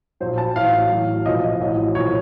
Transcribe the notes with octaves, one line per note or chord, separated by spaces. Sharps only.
A#1 A#2 F#3 C5
A5
A1 A2 F#3 F5
A1 A2 F#3
C2 A#2 F3 D#5
D#5
A1 A2 F#3
C2 A#2 F3 C#5